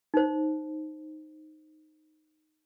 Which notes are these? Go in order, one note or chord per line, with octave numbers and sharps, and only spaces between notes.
D#4 C5